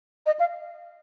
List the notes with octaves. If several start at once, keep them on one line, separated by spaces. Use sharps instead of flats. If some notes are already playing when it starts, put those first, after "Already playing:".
D#5
F5